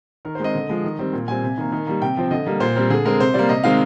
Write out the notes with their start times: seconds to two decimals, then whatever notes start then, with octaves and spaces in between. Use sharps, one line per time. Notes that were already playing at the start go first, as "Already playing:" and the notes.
0.25 D#3 A#4
0.35 C5
0.40 G#3 C4 D#5
0.55 D3
0.70 F3 G#3
0.84 D#3
0.99 G3 C4
1.13 A#2
1.28 G3 C4 G#5
1.43 C3
1.58 D#3 A#3
1.72 D#3
1.87 G3 A#3
2.02 C3 G5
2.17 F3 C4
2.31 D3 D#5
2.46 G3 A#3
2.60 A#2 C5
2.75 G3 C4 A#4
2.90 D3 G#4
3.05 G#3 C4 A#4
3.20 C3 C5
3.34 G3 A#3 D5
3.49 C3 D#5
3.64 D#3 G#3 C4 F5